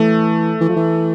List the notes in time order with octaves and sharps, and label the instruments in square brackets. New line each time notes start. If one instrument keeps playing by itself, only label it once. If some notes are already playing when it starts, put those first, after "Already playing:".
Already playing: [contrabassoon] E3 [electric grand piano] A3
[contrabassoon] E3
F3
E3